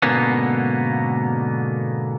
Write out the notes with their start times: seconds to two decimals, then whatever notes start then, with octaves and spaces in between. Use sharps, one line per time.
0.02 G#2 B2 D3 A#3 B3 C#4